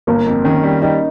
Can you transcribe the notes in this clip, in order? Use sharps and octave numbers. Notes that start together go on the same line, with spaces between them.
G1 A#3
F2
D#3 C#4
G3
G3 D#4